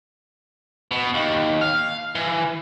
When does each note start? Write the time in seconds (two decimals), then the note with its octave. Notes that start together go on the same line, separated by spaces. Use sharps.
0.91 B2
1.14 D#2
1.61 F5
2.15 E3